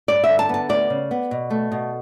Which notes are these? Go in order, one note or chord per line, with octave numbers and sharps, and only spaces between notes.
G2 D5
E5
D3
A5
B3 A5
D2 D5
C#3
B3
B2
A3
B2